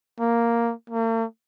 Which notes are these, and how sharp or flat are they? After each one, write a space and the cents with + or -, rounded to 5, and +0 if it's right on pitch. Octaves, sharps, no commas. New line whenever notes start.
A#3 +0
A#3 -45